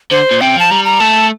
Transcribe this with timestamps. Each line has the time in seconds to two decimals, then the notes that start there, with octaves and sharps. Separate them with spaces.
0.11 D3 C5
0.31 A#2
0.41 C3 G5
0.56 F3 A5
0.71 G3 A#5
0.85 A#5
1.00 A3 A5